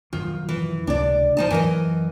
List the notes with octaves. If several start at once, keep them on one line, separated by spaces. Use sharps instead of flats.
F#2 D#3 F3 F4
E3
C#2 C3 D4 D5
F3 D#4 A5
F#2 E3 A#4 D#5